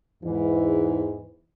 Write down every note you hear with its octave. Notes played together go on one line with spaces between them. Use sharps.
E2 G#2 E3